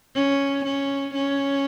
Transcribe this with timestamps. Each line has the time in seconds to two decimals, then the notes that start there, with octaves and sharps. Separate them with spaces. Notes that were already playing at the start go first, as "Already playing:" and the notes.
0.15 C#4
0.65 C#4
1.14 C#4